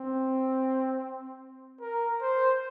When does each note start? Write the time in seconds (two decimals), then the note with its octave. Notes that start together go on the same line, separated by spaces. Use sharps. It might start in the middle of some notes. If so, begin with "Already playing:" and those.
Already playing: C4
1.81 A#4
2.21 C5